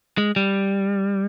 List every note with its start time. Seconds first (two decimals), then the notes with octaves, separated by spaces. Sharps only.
0.18 G#3
0.36 G3